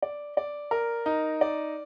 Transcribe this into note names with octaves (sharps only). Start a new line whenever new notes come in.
D5
D5
A#4
D#4
D5